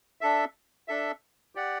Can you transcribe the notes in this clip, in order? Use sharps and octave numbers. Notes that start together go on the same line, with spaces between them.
D4 A4 E5
D4 A4 E5
G4 D5 F#5